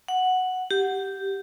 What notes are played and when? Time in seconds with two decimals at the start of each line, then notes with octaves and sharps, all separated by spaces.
0.08 F#5
0.71 G4